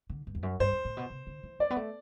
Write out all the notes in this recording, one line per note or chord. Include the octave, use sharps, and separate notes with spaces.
D3
G2
E2
F#2
G2 C5
E2
A2
B2
C3
D3
E3
F#3 D5
B3
A3